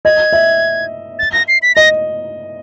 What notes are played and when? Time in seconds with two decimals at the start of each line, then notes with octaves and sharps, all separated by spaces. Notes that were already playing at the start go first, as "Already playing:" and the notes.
0.05 D#5 G#6
0.33 E5
1.19 A6
1.33 A#6
1.48 C7
1.62 B6
1.76 D#5 A#6